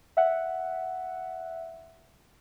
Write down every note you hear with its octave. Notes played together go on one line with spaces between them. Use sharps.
E5 F#5